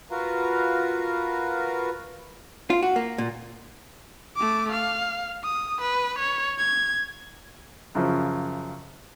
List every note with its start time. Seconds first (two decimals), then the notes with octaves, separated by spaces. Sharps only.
0.11 F4 F#4 A#4 B4 F5 A#5
2.70 F4
2.83 F#4
2.96 A#3
3.18 A#2
4.36 A3 D6
4.72 F5
5.44 D#6
5.81 B4
6.19 C#5
6.58 G#6
7.95 F#2 C#3 F3